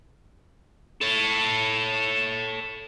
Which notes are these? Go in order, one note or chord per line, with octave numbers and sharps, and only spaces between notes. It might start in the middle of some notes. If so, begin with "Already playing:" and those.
A4 C#5